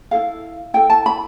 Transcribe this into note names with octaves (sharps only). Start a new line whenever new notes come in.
E4 A4 F5
E4 A4 G5
A5
B5